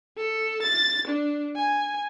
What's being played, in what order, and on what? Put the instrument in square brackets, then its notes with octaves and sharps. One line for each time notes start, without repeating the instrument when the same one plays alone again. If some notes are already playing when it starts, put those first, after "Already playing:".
[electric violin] A4
A6
D4
G#5